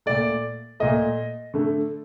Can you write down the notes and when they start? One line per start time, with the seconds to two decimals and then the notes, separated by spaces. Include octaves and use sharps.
0.06 A#2 A3 D5
0.80 A#2 A3 D#5
1.54 D3 A3